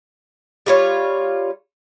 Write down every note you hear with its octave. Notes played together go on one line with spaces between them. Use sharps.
G3 F4 C#5